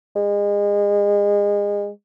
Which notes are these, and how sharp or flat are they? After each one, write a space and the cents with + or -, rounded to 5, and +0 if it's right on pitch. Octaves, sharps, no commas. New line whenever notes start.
G#3 -30